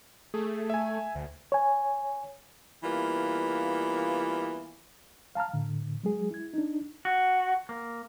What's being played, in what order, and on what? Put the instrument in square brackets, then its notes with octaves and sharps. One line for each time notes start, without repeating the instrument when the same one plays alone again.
[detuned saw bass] A3 [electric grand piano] G#4
[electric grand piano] E5 G#5
[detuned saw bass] D2
[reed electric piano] C#5 G#5
[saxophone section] E3 G3 A#3 B3 F4
[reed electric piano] F5 A5 A#5 F6
A2 D3
F#3 G#3 G#4
E4 G#6
D4 D#4
[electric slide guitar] F#4
A#3